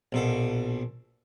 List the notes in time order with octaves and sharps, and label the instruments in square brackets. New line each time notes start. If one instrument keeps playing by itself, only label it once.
[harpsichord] A#1 B2 A4